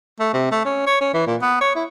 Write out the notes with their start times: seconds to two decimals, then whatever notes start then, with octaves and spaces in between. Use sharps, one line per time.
0.20 A3
0.34 C3
0.51 A3
0.65 C#4
0.87 C#5
1.01 C#4
1.14 E3
1.27 A#2
1.41 B3
1.61 C#5
1.75 E4